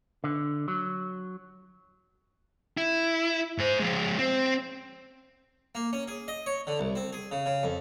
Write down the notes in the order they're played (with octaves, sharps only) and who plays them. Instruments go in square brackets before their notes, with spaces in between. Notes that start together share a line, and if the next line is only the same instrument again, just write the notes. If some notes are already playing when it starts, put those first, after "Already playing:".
[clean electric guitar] D3
F#3
[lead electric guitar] E4
G#2 C5
F3 G#3
C4
[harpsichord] A#3
C#4
G#4
D#5
C#5
D3
C2
C4
G#4
C#3
C#3
F2